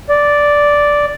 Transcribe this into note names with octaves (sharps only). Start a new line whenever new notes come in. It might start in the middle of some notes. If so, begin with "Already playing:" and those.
D5